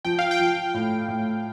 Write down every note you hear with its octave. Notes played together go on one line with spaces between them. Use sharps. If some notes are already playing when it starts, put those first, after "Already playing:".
F3 G5
F5
G5
F3
A2
A2